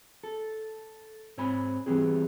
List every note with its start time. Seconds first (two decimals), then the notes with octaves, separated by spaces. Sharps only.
0.24 A4
1.38 G#2 C4 C#5 G#5 B5
1.86 E3 G3 B3 C4 G#4